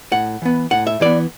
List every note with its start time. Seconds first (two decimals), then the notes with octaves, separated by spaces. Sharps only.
0.12 A2 F#5
0.42 E3 B3
0.71 A2 F#5
0.87 E5
1.01 E3 B3 D5